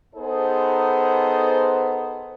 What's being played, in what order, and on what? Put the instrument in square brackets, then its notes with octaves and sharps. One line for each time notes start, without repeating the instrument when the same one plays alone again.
[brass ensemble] B3 D#4 G#4 A4 C5